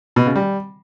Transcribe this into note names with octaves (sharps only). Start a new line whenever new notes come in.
B2
C#3
G3